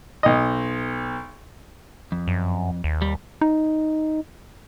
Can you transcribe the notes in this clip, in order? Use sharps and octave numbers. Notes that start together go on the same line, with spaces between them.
B1 D#5
F2
F#2
D#2
G3
D#4